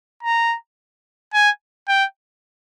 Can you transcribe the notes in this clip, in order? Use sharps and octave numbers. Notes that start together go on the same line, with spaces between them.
A#5
G#5
G5